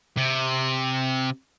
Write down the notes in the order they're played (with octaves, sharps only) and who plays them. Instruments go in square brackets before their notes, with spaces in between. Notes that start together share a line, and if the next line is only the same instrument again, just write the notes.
[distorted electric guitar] C3